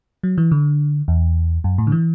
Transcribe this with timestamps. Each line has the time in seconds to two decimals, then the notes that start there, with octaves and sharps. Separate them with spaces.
0.23 F#3
0.38 E3
0.51 D3
1.08 E2
1.64 F#2
1.78 A2
1.87 D3
1.92 E3